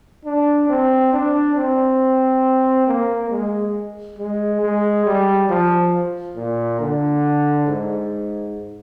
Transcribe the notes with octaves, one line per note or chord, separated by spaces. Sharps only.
D4
C4
D4
C4
A#3
G#3
G#3
G#3
G3
F3
A#2
D3
G#2